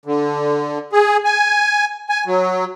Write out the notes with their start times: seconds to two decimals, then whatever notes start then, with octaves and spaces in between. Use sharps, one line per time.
0.06 D3
0.93 G#4
1.25 G#5
2.09 G#5
2.26 F#3